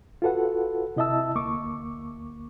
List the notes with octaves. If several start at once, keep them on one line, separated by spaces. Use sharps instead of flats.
F4 F#4 A4 B4 F#5
C3 E4 D#5 E5 A5 E6
D2 A#3 C#6 D6